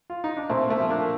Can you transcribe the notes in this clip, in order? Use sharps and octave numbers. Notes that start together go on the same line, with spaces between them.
F4
D#4
D4
A#2 A3 C4
A3 C4
F3
A#3 D4